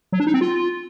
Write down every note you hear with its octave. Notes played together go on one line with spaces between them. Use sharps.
F#3
D4
D#4
C4
F4